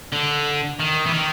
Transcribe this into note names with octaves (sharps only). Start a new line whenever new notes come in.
D3
D#3
E3
D#3